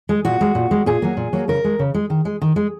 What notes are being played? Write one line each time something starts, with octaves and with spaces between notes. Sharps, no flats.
G#3
A#2 F#4
G#3
A#2
G#3
A#2 G#4
F#3 A#3
A#2
F#3 A#3
C#3 A#4
G#3
C#3
G#3
D#3
G#3
D#3
G#3